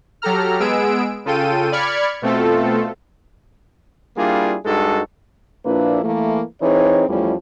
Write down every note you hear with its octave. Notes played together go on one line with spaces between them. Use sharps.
F#3 G4 A4 A#5 F6
G#3 B3 G#4 E6 D7
C#3 F4 A4 G5 D#7
D5 B5 F6 G#6 C#7
B2 A3 C4 F4 A4
G3 A#3 D4 E4 F4 G#4
G2 G#3 D#4 F#4 A4
A#2 F3 A#3 D4 E4 B4
E3 A3 A#3
E3 C4 D#4 G#4 C#5
E2 F3 G3 A3 C#4 E4